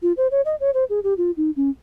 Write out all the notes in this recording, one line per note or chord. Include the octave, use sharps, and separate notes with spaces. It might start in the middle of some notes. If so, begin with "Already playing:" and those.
F4
C5
C#5
D#5
C#5
C5
G#4
G4
F4
D#4
C#4